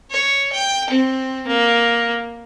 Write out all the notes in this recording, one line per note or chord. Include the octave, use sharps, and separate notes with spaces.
C#5
G5
C4
A#3